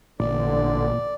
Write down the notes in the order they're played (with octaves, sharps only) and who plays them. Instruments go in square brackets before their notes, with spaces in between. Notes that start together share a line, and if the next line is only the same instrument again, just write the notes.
[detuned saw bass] A1 [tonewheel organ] A#2 [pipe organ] D3 [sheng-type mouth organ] D5